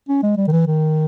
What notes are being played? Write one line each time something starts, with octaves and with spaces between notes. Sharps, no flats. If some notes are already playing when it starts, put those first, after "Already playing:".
C#4
G#3
G3
D#3
E3
D#3